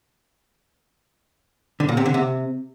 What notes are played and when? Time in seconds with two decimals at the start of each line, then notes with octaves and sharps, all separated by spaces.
1.80 D3
1.89 A#2
1.97 C3
2.06 D3
2.14 C3